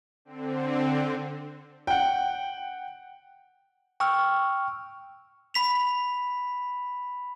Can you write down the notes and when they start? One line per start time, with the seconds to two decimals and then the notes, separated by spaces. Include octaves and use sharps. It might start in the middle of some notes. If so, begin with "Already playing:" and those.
0.25 D3 C4
1.87 F#5 G5
4.00 G5 C#6 E6 F6
5.54 B5 B6 F7